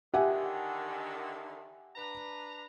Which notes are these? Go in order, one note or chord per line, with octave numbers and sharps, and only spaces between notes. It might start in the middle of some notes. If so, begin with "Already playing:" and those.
D3 D#3 G4 E5 F#5 G#5
D4 B4 A#5